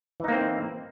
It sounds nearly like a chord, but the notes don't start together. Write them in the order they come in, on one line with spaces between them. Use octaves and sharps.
E3 D#4 A#3 C4